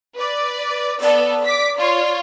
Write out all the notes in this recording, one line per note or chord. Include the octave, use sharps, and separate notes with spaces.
B4 D5
B3 A4 D5
D6 B6
F4 C#5